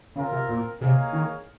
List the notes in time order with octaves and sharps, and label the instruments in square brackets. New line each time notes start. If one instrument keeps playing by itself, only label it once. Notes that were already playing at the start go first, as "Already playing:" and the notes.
[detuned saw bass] C#3 [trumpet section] C4 F4 A#4 F5
[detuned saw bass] C3
A#2
[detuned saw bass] C3 [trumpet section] A#3 D#4 G#4 C#5 F5
[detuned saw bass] D#3